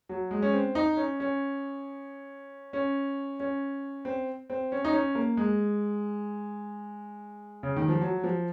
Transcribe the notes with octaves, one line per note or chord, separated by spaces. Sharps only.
F#3
G#3
C#4
C4
D#4
C#4
C#4
C#4
C#4
C4
C4
C#4
D#4
C#4
A#3
G#3
C#3
D#3
F3
F#3
F3